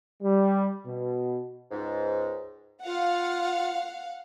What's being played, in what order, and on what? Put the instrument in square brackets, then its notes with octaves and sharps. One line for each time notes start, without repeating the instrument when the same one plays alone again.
[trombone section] G3
B2
[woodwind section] C#2 G#2
[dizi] F4 [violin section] F5 F#5